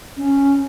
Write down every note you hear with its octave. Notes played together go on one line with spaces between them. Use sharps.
C#4